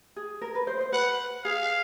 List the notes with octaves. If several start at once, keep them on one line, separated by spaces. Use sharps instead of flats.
G#4
A#4
B4
C5
C5
B4 F#5
G#4 F5